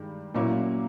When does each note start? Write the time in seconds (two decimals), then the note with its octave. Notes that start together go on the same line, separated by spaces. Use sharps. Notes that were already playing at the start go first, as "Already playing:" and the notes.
Already playing: G2 D#3 G#3
0.35 A#2 F#3 A#3 C#4 E4